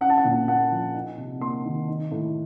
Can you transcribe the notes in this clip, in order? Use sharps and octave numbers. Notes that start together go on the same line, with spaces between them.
C#4 F#5
A5
F#5
A#2
A#3 F#5
F3
D#4
C3
A#3 C6
D#3
D#4
A2